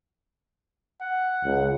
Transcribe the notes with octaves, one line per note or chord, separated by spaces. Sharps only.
F#5
C#2